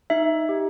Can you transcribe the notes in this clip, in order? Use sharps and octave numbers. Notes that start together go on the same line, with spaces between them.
D#4 E5
G4